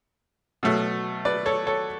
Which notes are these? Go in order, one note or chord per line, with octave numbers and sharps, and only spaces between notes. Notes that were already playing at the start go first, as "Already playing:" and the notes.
B2 F#3 A3
B4 D5
A4 C#5
A4 C#5